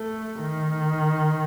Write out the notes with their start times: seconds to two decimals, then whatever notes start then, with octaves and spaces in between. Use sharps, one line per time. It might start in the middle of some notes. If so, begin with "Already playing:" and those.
Already playing: A3
0.42 D#3